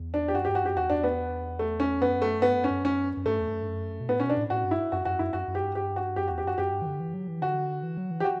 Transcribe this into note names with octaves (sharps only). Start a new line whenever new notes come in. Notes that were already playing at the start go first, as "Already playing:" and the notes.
Already playing: E2
D4
G4
F#2 F#4
G2 G4
F#4
F#2 G4
E2 F#4
D4
B3
A3
C#4
F#2 B3
A3
G2 B3
F#2
C#4
F#2
C#4
F#2
G2 A3
E2
G2
F#2
G2
F#2
B2
A2 B3
B2 C#4
D4
A2
A2 F#4
G2
E4
F#2 F#4
F#2 F#4
F#2 E4
F#2 F#4
F#2
G4
G2
G4
F#4
F#2 G4
E2 F#4
G4
F#2 F#4
F#2 G4
G2
E3
D3
E3
F#3
E3
D3 F#4
E3
F#3
E3
G4
F#4